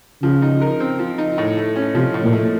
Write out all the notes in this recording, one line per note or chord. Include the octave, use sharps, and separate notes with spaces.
C#3 F3
D#4
A#4
C4
F3
D#4
A2
A3
C#4
C3 F3
A2
A#2
A3